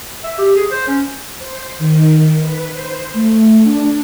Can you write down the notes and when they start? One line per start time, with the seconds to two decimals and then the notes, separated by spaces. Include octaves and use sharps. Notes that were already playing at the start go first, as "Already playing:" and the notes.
0.24 E5
0.38 G4
0.56 G#4
0.71 C5
0.88 C#4
1.38 C5
1.78 D#3
2.40 B4
2.72 C5
3.13 A3
3.63 D4